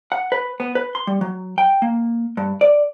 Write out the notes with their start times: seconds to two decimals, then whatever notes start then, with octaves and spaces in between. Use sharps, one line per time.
0.12 F#5
0.32 B4
0.60 B3
0.75 B4
0.95 C6
1.07 G3
1.21 F#3
1.58 G5
1.82 A#3
2.37 G2
2.61 D5